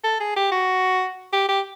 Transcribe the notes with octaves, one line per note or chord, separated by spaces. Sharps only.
A4
G#4
G4
F#4
G4
G4